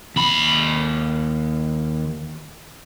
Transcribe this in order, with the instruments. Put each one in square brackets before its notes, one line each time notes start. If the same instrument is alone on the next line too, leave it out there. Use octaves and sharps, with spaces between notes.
[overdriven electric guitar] D#2 B5